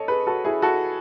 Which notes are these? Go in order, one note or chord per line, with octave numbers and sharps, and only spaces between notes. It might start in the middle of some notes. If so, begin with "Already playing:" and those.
Already playing: A4 C#5 D#5
G#4 B4
F#4 A4
E4 G#4
F#4 A4